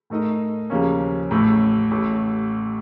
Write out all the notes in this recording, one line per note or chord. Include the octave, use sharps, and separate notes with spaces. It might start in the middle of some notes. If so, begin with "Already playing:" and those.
A2 A3 D#4 A#4 D#5
D#2 C#3 F3 A#3 C#4
A1 A2 A3
A1 A2 A3